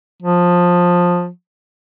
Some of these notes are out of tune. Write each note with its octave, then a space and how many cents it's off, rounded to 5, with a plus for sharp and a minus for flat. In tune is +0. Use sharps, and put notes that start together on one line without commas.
F3 +15